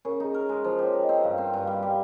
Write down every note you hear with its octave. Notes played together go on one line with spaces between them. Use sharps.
C#3 A#4
D#4 G#4
A#4
G#3
F3 C5
G4
C#5
A#4
D#5
C4
G2 F5
C4 G5
G2 G#5
F5
G3 G5
G3 F5